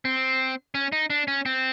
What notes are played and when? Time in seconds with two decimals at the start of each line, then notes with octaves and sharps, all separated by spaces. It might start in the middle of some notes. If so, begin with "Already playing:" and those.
0.05 C4
0.75 C#4
0.92 D#4
1.10 D4
1.28 C#4
1.46 C4